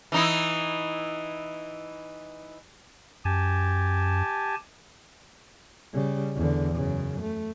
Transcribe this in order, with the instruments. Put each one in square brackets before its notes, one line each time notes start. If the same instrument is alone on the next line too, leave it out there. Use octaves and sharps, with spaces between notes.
[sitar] E3 D#4 E4
[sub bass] F#2 [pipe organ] G4 G#5 A5
[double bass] C#3 G3
E2 D3
F#2 C#3
A3